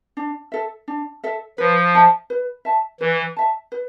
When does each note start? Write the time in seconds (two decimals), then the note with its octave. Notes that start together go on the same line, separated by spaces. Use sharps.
0.17 D4
0.52 A4 E5
0.88 D4
1.24 A4 E5
1.58 F3 B4
1.95 E5 A5
2.30 B4
2.65 E5 A5
3.00 E3 B4
3.37 E5 A5
3.72 B4